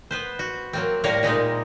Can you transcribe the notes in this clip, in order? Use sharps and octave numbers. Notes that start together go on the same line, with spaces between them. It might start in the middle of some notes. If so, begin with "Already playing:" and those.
B3 B4 C5
F#4
F#3 A#3 C4
A2 G3 A#3 A#4 C#5 F5
A#2 G#3 C4 D#4